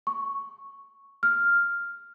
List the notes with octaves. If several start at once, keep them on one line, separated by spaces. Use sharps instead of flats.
C#6
F6